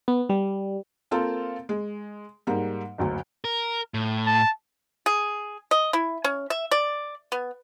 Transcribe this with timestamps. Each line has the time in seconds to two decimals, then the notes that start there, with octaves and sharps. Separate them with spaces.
0.08 B3
0.30 G3
1.11 A#3 C4 F4 A4 A#4
1.69 G#3
2.47 G#2 G3 A#3
2.98 F#1 D2 F#3
3.44 A#4
3.94 A2
4.26 A5
5.06 G#4
5.71 D#5
5.93 E4
6.24 C#4
6.50 E5
6.71 D5
7.32 B3